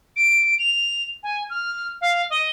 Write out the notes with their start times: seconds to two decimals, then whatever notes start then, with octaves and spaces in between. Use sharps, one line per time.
0.16 D7
0.59 F7
1.23 G#5
1.50 F6
2.01 F5
2.30 D#5